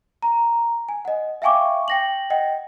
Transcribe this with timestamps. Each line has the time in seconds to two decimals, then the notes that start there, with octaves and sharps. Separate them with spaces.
0.23 A#5
0.89 G#5
1.05 D#5 F#5
1.42 E5 F5 G5 G#5 C#6 D6
1.88 G5 A#6 F#7
2.30 D#5 F#5 G5